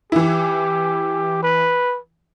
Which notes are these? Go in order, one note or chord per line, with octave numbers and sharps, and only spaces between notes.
E3 E4 G4
B4